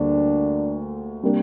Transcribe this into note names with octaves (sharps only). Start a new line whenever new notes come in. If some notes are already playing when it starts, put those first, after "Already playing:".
Already playing: D2 D3 G3 A#3 D4
C3 G3 A#3 D4